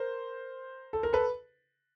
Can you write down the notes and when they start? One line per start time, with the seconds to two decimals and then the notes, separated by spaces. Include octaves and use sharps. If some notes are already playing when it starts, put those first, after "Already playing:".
Already playing: A#4 C5
0.93 A4
1.03 A#4
1.13 A4 B4